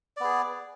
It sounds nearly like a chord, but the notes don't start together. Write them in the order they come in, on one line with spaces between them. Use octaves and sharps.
D5 B3 G#4